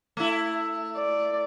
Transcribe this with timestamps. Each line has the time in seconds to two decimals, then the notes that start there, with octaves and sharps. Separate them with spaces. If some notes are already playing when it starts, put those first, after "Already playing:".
0.17 A3 E4
0.97 D5